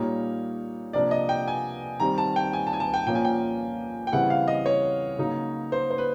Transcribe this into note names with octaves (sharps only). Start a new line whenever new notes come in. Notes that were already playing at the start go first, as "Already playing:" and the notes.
Already playing: A#2 G3 A#3 D#4 C#5
C3 F3 A#3 D4 D5
D#5
G5
G#5
D#3 G3 C4 A#5
A5
G5
G#5
A5
G#5
A5
G5
A#2 F3 A#3 C#4 G5
G#5
G5
G5
C#3 E3 G3 C4 E4 F#5
F5
D#5
C#5
C#3 F#3 A#3 D#4
C5
C5
B4